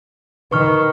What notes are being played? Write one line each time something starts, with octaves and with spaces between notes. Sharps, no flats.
D#3 B4 C#6 F6